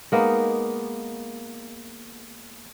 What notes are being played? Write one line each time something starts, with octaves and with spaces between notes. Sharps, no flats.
G#3 A#3 B3 D#4